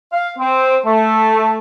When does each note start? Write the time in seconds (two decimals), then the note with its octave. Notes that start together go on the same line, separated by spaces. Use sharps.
0.13 F5
0.39 C4
0.85 A3